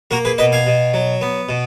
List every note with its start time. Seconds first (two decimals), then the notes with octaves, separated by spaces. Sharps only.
0.11 A#3 F#4 A#4
0.25 G#4 B4
0.38 B2 B4 D#5
0.52 F5 G#5
0.66 B2
0.94 F#3
1.21 B3
1.49 B2